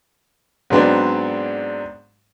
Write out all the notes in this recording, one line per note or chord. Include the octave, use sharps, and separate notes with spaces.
G#2 F#3 G#3 B3 C4 D4